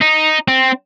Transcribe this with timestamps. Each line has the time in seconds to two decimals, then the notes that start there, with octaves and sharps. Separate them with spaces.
0.01 D#4
0.48 C4